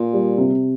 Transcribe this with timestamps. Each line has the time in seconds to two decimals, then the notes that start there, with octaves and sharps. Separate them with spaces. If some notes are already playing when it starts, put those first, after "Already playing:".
Already playing: A#2
0.13 G3
0.38 C3